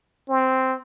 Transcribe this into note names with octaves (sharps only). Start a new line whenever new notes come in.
C4